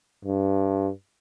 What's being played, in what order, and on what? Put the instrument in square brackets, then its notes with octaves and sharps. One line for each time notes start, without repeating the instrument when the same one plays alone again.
[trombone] G2